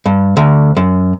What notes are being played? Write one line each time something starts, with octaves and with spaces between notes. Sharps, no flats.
G2
D2
F#2